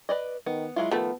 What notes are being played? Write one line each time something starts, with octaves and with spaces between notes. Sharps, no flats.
B4 D5 D#5
D#3 B3
F#3 G#3 E4 F4
D#3 F3 A3 B3